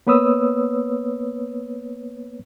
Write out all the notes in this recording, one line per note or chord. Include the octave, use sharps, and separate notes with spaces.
A#3 B3 B4 C#5 D#6 E6